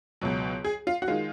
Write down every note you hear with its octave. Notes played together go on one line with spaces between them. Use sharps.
C#2 B2 F#3
G#4
F4
F#4
D#3 G#3 F4